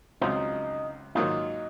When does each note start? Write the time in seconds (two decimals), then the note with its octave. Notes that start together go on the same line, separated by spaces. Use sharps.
0.21 C#2 C#3 F#3 C4 D#4 F4
1.15 G#2 D#3 F#3 A#3 D#4 F4